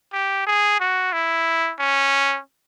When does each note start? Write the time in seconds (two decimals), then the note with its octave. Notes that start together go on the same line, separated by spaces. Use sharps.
0.13 G4
0.47 G#4
0.80 F#4
1.13 E4
1.79 C#4